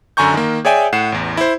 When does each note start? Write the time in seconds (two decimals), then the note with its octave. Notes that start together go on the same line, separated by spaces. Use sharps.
0.17 F#2 D3 G#5 A#5 C#6 G6
0.34 D#3 A#3
0.65 G#4 C#5 D5 E5 G5 G#5
0.93 A2 F#5 C7 E7
1.12 A1 E2
1.37 E4 C5